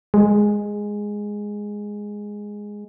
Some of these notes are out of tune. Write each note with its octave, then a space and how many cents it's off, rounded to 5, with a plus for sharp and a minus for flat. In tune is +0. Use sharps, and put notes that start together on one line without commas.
G#3 -5